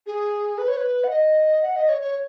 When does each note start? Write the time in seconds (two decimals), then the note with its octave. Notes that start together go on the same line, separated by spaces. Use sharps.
0.07 G#4
0.58 B4
0.68 C#5
0.77 B4
1.04 F#5
1.10 D#5
1.62 F#5
1.76 D#5
1.89 C#5
2.02 C#5